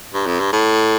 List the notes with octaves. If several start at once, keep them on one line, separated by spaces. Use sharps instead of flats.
G2
F2
G2
A2